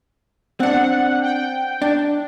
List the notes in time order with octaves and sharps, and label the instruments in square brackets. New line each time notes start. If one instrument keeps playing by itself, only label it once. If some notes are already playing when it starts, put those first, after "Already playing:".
[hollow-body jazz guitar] C4 D4 [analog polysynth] F#5
[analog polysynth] G5
[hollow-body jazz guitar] D4